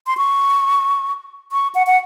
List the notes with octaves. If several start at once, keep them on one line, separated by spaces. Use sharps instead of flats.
C6
C#6
C#6
F#5
F#5